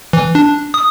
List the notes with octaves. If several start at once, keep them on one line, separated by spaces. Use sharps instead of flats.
E3
D4
D#6